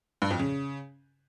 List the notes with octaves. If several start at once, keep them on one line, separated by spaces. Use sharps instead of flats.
G2
F2
C#3